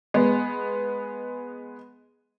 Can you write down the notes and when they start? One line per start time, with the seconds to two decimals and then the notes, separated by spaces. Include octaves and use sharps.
0.14 G#3 B3